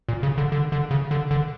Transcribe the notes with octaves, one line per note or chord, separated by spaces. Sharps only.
A#2
C#3
D3
D3
D3
C#3
D3
D3